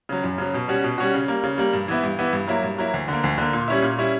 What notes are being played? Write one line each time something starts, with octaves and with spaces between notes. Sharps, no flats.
C#3 F#3
F#2
C#3 F#3
B2
G3 C#4 F#4
B2
G3 C#4 F#4
C#3
G3 A#3
C#3
G3 A#3
G2
E3 B3 E4
G2
E3 B3 E4
G2
F#3 A#3 E4
G2
F#3 A#3 E4
D2
D3 A#3
D2
D3 A#3
A#2
G3 C#4 E4
A#2
G3 C#4 E4